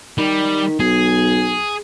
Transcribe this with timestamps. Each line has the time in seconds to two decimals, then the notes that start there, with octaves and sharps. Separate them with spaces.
0.18 D#3 G3
0.80 B1 G#4